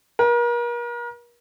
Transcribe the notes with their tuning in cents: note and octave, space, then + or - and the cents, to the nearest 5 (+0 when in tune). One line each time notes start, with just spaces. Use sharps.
A#4 +40